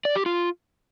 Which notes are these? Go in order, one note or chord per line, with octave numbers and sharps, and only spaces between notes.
D5
G4
F4